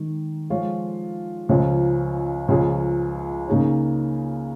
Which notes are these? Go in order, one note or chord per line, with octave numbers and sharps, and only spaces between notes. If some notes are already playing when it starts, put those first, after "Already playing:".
Already playing: D#3 G#3 D#4
F3 G#3 F4 C#5
C#2 C#3 F3 C#4
C#2 C#3 F3 C#4 G#4
C#3 A#3 D#4 G#4 C#5